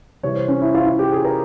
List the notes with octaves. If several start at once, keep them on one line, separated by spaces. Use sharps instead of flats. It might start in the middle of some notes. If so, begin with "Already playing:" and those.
C3 E3 G3 C#5
C5
C#4
E4
F4
F4
G4
G#4
A#4